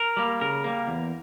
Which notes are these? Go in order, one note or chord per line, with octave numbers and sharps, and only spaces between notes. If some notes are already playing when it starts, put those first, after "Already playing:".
Already playing: A#4
G3 A#3
C#3 A#4
G3 A#3
E2